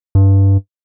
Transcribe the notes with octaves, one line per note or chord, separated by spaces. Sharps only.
G2